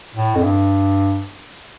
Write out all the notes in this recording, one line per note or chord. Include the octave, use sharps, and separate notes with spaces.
A2
F2
G2